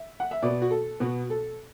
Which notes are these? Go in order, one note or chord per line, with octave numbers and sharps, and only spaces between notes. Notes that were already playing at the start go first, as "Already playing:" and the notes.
Already playing: E5
F#5
E5
B2 B3 D5
F#4
A4
B2 B3 F#4
A4